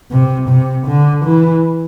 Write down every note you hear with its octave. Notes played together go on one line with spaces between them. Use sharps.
C3
C3
D3
E3